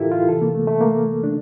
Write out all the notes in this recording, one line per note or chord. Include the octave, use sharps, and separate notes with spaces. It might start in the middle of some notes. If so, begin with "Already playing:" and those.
Already playing: A2 E3 E4 F4 G4 A4 A#4
F4
C3 E3 A4
A#3
A3
A3
A#3
D4